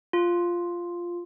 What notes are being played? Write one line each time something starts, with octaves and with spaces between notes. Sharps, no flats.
F4